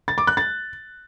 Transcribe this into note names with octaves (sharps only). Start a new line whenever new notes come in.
A6
D6
F#6
A6